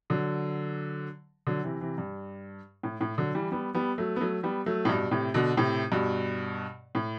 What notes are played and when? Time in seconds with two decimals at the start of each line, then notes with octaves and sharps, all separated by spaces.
0.10 D3 F#3
1.47 D3 F#3
1.64 C3 E3
1.81 C3 E3
1.98 G2
2.83 A2
3.01 A2
3.18 D3 F#3
3.35 E3 G3
3.52 G3 B3
3.75 G3 B3
3.98 F#3 A3
4.16 B3
4.21 F#3 A3
4.43 G3 B3
4.66 F#3 A3
4.85 A2
4.89 G2 B2
5.11 A2 C3
5.34 B2 D3
5.57 A2 C3
5.92 G2 B2
6.95 A2